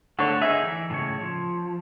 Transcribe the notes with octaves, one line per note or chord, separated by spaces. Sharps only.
D3 A3 C#5
D#4 G#4 E5
E3
A2 C#3 C#5
F3